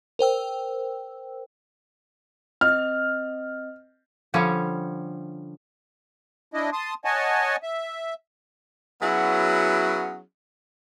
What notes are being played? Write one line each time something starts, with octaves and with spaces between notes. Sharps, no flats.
A#4 C5 G5 E6
C4 D#5 F6
D3 F3 G3 C#4
D4 E4 D#5
A5 C6 D#6
C#5 D#5 F#5 G#5 A5
E5
F#3 B3 C#4 E4 F#4 G#4